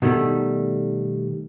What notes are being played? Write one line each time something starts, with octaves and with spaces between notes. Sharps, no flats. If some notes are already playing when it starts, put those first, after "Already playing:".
B2 D#3 G3 A3